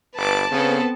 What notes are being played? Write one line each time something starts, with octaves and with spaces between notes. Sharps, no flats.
G1 B4 A5 D6
C#3 B3 C4 A4